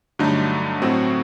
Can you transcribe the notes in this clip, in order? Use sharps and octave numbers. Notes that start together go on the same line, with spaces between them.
G2 D3 F#3 A3 D#4
A2 F#3 C4 F#4